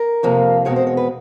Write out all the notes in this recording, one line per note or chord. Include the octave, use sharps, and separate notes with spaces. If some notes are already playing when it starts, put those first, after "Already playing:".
Already playing: A#4
F2 C3 F3 A#3
E2 B2 G#3 C4 C#5
C5
C#5
B4